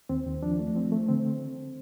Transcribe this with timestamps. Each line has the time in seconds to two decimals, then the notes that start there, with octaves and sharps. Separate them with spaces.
0.09 D#2 C4
0.26 D#2
0.42 F3 D4
0.59 A3
0.75 F3 C4
0.92 A3
1.09 D3 C4